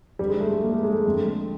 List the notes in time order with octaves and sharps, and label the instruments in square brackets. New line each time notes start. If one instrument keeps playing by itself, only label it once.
[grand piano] F2 G3
D3
G#3
A3
G#3
A#3
A3
G#3
A3
F2 D3